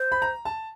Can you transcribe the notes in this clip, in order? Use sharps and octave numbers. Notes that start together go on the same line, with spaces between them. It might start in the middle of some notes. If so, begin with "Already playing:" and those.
Already playing: C5
B5
A#5
A5